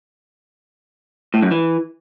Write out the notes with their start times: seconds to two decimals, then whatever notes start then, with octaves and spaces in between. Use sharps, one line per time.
1.34 A2
1.42 F#2
1.51 E3